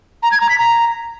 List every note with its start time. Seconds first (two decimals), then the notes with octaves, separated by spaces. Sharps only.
0.23 A#5
0.32 G#6
0.40 A#5
0.49 B6
0.58 A#5